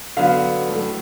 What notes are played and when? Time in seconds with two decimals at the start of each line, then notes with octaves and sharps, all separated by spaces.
0.17 D3 F#3 B3 F5
0.69 A2 F#3 A3